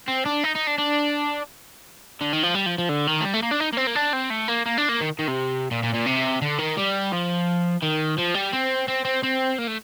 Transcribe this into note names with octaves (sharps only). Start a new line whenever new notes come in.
C4
D4
D#4
D#4
D4
D4
D3
D#3
F3
G3
F3
F3
D3
D#3
A3
G3
A3
A#3
D4
D#4
A#3
C4
A#3
D4
C4
A3
A#3
A#3
D4
A#3
D#3
D#3
C3
A#2
A#2
A#2
C3
D3
D#3
G3
F3
D#3
F3
G3
C4
C4
C4
C4
A#3
A3